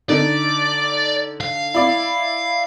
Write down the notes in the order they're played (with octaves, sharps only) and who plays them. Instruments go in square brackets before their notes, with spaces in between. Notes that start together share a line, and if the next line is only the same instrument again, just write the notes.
[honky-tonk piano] D3 D#4 [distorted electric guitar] D5
[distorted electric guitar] F5
[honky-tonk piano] E4 D5